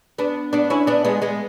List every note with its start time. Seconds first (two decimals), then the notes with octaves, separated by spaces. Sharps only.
0.18 B3 D4
0.53 B3 D4
0.70 C#4 E4
0.87 B3 D4
1.05 G#3 B3
1.22 G#3 B3